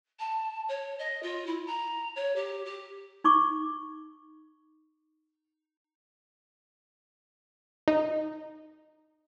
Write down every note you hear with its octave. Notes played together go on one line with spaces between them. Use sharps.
A5
C#5
D#5
F4
E4
A#5
C#5
G4
G4
D#4 C#6 D6
D#4